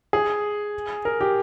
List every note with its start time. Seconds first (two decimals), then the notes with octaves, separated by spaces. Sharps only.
0.13 G#4
1.05 A#4
1.21 G4